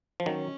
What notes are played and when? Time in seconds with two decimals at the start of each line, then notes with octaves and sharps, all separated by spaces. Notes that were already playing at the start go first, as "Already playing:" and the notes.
0.20 F3
0.26 D#3 F#3 C#4